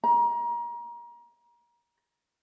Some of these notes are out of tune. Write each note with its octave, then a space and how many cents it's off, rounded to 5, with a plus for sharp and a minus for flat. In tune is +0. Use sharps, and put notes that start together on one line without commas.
A#5 +30